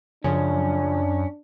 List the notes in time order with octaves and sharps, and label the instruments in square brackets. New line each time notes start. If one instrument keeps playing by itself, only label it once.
[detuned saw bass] F#2 [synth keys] C#3 F3 [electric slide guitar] C#4 [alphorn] D4